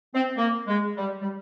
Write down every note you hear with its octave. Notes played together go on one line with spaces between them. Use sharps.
C4
A#3
G#3
G3
G3